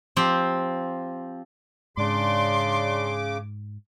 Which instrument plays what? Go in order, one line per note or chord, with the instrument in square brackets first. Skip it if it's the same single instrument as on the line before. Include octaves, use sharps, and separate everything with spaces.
[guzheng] F3 C4 G4
[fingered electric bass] G#2 [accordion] C#3 D6 [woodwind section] D4 D5 C6